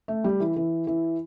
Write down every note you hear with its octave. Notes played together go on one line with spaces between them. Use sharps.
A3
G3
E3
E3
E3